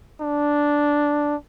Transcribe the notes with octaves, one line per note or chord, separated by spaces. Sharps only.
D4